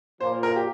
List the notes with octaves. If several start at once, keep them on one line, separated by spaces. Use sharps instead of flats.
A#2 F3 A#3 C5
A#4
G4